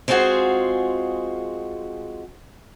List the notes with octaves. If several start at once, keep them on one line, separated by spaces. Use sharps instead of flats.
G#3 B3 C4 F4 F#4 G#4